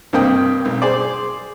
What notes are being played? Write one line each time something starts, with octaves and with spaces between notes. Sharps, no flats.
G2 C3 A#3 D#5 G5 D#6
B1
G#4 C5 D5